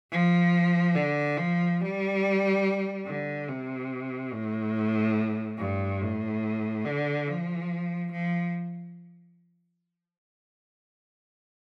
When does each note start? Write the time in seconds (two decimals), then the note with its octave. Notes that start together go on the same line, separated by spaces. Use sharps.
0.11 F3
0.95 D3
1.37 F3
1.80 G3
3.06 D3
3.49 C3
4.33 A2
5.58 G2
6.01 A2
6.85 D3
7.27 F3
8.12 F3